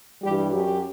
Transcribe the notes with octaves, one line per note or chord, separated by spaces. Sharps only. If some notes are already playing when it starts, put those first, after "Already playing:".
G2 E3 G3 G4
F#2 F#3 G4